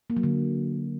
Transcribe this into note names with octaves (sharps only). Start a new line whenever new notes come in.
A#3
F#3
D3